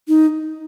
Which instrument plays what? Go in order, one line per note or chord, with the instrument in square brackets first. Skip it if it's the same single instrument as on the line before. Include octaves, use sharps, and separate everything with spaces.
[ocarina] D#4